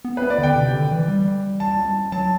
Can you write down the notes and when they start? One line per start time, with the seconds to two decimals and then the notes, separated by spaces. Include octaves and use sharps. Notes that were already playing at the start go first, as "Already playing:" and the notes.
0.05 B3
0.17 B4
0.22 B3
0.30 D5
0.38 D3
0.43 G5
0.55 C3
0.73 D3
0.91 E3
1.08 G3
1.60 A5
2.12 F#3 A5